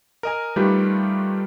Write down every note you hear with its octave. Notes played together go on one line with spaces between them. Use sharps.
A#4 D#5 G#5
D#3 G3 A3 F4 G4 B4